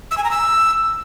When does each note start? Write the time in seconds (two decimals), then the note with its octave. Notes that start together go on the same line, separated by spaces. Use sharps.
0.11 E6
0.18 G#5
0.24 A#5
0.31 E6